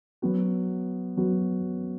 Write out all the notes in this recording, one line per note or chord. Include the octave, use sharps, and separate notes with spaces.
F#3 B3 F#4
F#3 B3 F#4